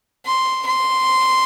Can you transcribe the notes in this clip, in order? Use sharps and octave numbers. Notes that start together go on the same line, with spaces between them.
C6
C6